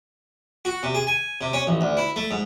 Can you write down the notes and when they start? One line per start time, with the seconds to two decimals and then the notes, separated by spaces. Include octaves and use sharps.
0.65 F#4
0.83 C3
0.95 G#4
1.07 G#5
1.41 C3
1.53 C#4
1.67 A1
1.81 D2
1.97 E4
2.16 A3
2.31 G#2